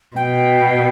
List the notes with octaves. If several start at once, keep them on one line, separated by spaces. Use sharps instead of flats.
B2 G5